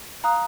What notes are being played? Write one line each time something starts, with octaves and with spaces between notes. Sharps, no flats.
F5 A#5 D#6 F#6